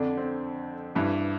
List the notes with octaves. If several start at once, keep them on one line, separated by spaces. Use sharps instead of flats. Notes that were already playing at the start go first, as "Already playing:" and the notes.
Already playing: F2 D3 D4
C4
G2 E3